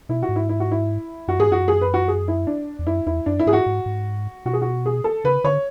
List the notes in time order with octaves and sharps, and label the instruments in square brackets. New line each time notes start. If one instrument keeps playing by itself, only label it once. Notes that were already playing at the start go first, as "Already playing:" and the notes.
[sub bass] B2 [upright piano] E4
[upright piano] F#4
[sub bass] G#2
[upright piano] E4
E4
F#4
E4
[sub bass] F#2 [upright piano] F#4
[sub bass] G#2 [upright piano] G#4
[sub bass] F#2 [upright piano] F#4
[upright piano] G#4
B4
F#4
G#4
E4
D4
[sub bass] E2
[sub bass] F#2 [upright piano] E4
[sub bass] E2 [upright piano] E4
[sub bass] F#2 [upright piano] D4
[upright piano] E4
[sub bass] G#2 [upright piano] G#4
[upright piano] F#4
[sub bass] G#2
G#2
[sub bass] B2 [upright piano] F#4
[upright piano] G#4
F#4
G#4
A4
[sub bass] C#3 [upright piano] B4
[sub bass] D3 [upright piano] C#5